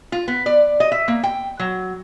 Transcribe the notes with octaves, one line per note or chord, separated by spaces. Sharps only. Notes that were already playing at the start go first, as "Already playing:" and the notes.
F4
B3
D5
D#5
E5
A#3
G5
F#3